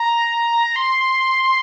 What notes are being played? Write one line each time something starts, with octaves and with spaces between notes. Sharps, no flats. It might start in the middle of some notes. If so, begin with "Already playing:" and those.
Already playing: A#5
C6